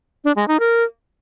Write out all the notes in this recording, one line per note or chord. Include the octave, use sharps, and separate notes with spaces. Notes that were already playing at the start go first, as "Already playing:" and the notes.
D4
G#3
D#4
A#4